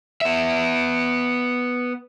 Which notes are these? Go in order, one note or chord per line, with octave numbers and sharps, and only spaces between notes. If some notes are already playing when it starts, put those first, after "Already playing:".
B3 E5